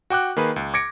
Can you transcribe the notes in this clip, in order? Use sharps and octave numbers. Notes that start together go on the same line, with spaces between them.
F#4 G5 D6 F#6
D#3 A#3 G#4 B4
C#2
D6 G#6 A#6 C#7 D7